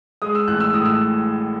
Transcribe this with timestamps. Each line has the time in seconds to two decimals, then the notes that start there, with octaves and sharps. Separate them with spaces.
0.22 G#3 D#6
0.35 E6
0.48 A1 F#6
0.60 E6
0.74 A2 D#6
0.85 E6